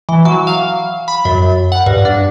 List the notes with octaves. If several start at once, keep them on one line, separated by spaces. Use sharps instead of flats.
E3
F#3
F5
B5
F#2
F#5
G2
D4